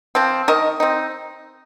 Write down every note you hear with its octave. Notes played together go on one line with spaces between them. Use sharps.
F3 C4
D#3 A#4 D#5
C4 D#4